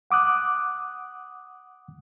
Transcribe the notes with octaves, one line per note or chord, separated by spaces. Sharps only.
F#5 D6 D#6 F#6